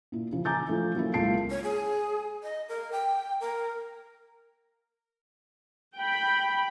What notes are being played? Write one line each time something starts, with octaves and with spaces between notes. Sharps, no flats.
A#2 E4
C#3 E3 F3
G#5 A#5 D6 G6 A6
F3 A3 E4
F#3 A#3 C#4 E4
C#2 A#3 F4 A5 C7 D7
C#5
G#4
D#5
A#4
G5
A#4
G5 B5